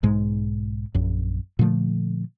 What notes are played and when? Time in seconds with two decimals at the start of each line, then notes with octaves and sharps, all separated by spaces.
0.03 B1 G#2 G#3
0.95 A#1 F#2
1.59 A#2 D3 F3 A3